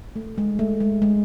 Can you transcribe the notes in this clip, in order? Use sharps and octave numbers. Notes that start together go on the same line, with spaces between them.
A3
G#3
A3
G#3
G#3